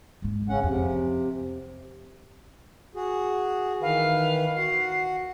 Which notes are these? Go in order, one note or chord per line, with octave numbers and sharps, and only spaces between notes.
G#1 G#3
C#3 C#4 F#5
F2 C3
F#4 G#4
D#3 E3 B4 F5
F#4 F#5 C7